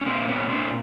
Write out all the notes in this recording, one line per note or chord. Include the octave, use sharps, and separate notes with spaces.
C#4
A#2 A#3 C4
B3 C#4
A#2 C4 D4